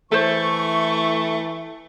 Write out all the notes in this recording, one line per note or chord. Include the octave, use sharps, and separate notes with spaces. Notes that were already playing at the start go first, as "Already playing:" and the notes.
E3 A3 A4 C5 C#6